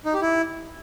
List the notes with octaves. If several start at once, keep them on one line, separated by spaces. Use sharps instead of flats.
D#4
G4
E4